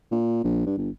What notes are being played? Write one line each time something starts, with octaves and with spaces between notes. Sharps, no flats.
A#2
A#1
G2
G1